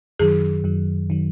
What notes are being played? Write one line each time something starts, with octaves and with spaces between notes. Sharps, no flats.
F#2 D#3 F#3 G#4
F#2 D#3 F#3
D#3 F#3